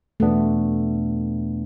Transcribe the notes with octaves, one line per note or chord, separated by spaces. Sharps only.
E2 B2 A3 B3 D4